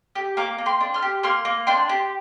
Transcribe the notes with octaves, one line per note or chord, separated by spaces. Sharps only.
G4
A#3 A#5 D6
A#3
G5 C6
D4
C6 F6
G4
A#3 C6 F6
A#3
D4 G5 C6
G4